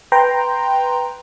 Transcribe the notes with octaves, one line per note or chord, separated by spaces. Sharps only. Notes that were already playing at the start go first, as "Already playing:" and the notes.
B4 G5 A#5 C6